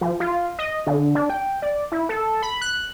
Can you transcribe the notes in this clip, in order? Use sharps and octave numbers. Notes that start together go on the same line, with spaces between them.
F3
F4
D#5
D3
D4
G5
D5
E4
A4
B5
F#6